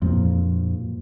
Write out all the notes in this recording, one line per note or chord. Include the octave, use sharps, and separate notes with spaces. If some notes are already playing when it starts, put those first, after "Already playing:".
F2 A#2